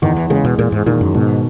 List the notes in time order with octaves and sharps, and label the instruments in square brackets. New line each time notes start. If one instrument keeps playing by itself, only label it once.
[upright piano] E2 [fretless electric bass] D#3
[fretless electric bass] E3
[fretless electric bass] C#3 [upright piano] G#3
[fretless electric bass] B2
[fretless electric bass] A#2 [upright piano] G#3
[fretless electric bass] G#2
[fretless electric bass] A#2 [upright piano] D#3
[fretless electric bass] F#2
[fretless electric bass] G#2 [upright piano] B2